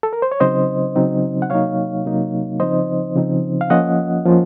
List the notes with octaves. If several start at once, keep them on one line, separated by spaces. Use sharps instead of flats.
A4
A#4
C5
C#5
C#3 F#3 C4 D#4 C5 D#5
C#3 F#3 C4 D#4
F#5
C3 F#3 A#3 D#4 C#5 F5
C3 F#3 A#3 D#4
C#3 F3 C4 D#4 C5 D#5
C#3 F3 C4 D#4
F5
F3 A#3 C#4 F4 D#5 F#5
F3 A#3 C#4 F4